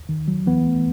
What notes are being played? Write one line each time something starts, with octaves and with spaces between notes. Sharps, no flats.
D#3
F#3
E3 B3
A3